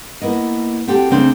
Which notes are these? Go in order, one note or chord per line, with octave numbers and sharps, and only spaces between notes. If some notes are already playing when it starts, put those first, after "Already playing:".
A#3 B3 E4 D#5
C4 F#4 G4 A4 G5
C#3 A3 C4 D4